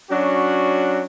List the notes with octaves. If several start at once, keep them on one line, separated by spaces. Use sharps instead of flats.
F#3 C#4 D4 F#4